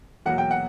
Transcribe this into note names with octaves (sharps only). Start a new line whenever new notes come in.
E2 B2 F#3 A#3 F#5
G5
F#5